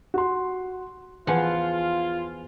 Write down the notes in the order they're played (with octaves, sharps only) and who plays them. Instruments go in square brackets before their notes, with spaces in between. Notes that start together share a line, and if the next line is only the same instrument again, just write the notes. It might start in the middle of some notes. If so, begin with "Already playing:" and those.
[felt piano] F#4 C6
[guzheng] E2 F3 F#5 [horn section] F4 [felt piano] B4 G#5